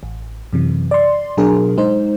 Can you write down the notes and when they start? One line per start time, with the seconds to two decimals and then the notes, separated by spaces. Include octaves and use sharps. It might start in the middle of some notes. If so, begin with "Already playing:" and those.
0.03 A1
0.53 F#2 C3 E3
0.91 D5 C6
1.37 B2 F#3 D4 G#4 A#4
1.77 G#3 D#4 C5